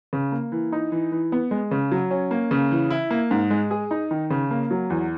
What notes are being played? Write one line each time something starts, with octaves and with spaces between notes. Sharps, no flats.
C#3
A#3
E3
D#4
E3
E3
B3
G#3
C#3
F#3
C#4
A#3
C#3
E3
E4
A#3
G#2
G#3
G#4
D#4
D#3
C#3
A#3
F#3
E2